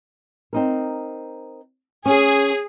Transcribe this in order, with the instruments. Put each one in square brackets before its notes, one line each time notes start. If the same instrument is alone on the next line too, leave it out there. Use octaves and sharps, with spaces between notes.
[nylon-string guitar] C4 D#4 A#4
[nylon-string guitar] C#4 [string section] G#4